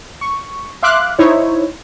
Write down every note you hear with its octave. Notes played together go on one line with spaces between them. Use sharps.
C#6
E5 F5 C6 D6 F#6
D#4 E4 C5 C#5